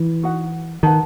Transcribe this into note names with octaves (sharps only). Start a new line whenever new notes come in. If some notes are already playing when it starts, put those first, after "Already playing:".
Already playing: E3
D#4 F#4 B4 F#5
D#3 B4 F#5 A5